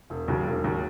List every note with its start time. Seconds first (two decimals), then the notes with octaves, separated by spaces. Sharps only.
0.10 E1
0.28 D#2 C#3 F#3
0.46 E1
0.64 D#2 C#3 F#3